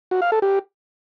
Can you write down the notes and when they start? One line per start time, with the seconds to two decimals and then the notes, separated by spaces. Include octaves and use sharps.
0.11 F#4
0.22 F5
0.32 A4
0.42 G4